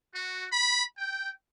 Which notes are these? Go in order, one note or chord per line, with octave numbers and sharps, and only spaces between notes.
F#4
B5
G5